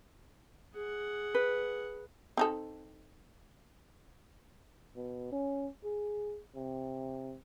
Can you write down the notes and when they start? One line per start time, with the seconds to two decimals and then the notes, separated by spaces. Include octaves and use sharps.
0.74 G#4 F#5
1.34 B4
2.37 C4 D#4 A4
4.96 B2
5.32 C#4
5.84 G#4
6.55 C3